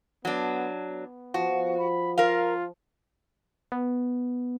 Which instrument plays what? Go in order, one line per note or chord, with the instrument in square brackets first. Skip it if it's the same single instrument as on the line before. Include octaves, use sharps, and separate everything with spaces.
[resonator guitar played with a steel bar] F#3 D4 [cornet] B3
[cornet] B3
[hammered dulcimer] F3 [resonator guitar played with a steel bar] F#4
[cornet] B5
[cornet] F4 [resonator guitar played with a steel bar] A#4 F5
[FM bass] B3